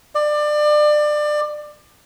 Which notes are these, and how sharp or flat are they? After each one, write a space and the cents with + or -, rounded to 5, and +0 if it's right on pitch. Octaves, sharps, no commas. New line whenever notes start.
D5 +25